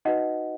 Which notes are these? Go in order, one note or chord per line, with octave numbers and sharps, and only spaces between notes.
D#4 F#4 B4 D#5 F#5